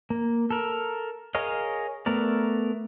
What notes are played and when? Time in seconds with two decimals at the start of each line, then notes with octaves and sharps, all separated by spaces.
0.10 A#3
0.50 A4 A#4
1.35 G#4 A#4 C#5 D#5 F5
2.06 A3 B3 A#4 D5